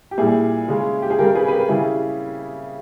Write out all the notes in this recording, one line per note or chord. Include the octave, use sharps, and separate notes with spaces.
G4
A#2 G3 E4 G#4
C#3 G#3
G4
G#4
C#3 G3 G4 A#4
G#4 B4
B4
G4 A#4
C#3 G3 E4 G#4